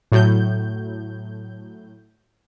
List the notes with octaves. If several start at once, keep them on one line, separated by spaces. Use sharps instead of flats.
A2 F#3 G6